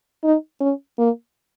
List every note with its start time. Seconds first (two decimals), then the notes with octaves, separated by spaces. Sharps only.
0.24 D#4
0.61 C#4
0.99 A#3